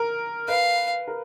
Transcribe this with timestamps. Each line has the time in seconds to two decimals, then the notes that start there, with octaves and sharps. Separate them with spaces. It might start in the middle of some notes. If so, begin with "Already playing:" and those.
Already playing: A#4
0.48 B4 F5
1.08 A#4